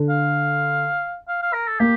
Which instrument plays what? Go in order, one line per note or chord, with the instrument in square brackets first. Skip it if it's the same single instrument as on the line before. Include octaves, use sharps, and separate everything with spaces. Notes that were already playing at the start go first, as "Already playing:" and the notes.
Already playing: [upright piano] D3
[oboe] F5
F5
F5
A#4
A4
[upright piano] A#3 [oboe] G4